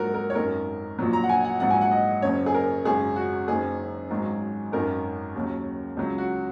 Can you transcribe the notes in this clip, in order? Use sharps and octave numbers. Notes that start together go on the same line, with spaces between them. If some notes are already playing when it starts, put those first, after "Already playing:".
Already playing: A#1 G#2 F#3 F#4 A#4
A#4
C#5
G#1 F#2 D#3 A#4
A#1 A#2 F#3
A#5
F#5
G#5
F#5
A#1 G#2 F#3 F#5
G#5
F#5
D#5
F#1 F#2 C#3 C#5
G#4
A#4
G#1 F#2 C#3 G#4
F#4
F#1 F#2 D#3 G#4
G#1 G#2 D#3 F#3
G#1 F#2 D#3 A#4
D#2 C#3 F#3
C#2 C#3 F#3
F#4